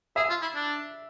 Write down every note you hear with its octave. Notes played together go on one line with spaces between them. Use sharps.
G#4 E5
F4
E4
D4